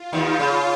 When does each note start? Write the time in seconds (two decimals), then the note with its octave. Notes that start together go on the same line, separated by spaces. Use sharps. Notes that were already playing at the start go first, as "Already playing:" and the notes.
Already playing: F4
0.13 D#2 D#3
0.40 C#3